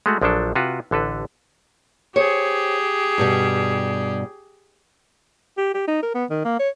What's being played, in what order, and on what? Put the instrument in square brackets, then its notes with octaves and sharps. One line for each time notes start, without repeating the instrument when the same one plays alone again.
[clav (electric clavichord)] G#3 A3 F#4
A#1 F3 F#3 D4 A4
C3 F4 F#4 B4
A1 D3 A4 B4
[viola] G4 G#4 [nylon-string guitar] C5 C#5
[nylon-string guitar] G2 B2 G3
[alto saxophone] G4
G4
D#4
A#4
B3
D#3
A#3
C#5